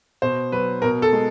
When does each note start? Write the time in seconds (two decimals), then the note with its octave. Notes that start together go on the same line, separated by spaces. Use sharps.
0.22 B2 C5
0.52 F#3 B4
0.82 B2 A#4
1.02 A4
1.13 G#3